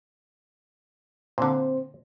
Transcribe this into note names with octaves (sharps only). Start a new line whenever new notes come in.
A#2 D3 C4 C5